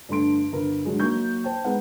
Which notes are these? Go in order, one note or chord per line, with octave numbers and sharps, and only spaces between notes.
G2 D3 A3 C6 D7
G1 A#4
D3 F#3 G#3
F#3 A#3 D#4 C#6 G6
C5 G5 A5
G#3 B3 D#4 F#5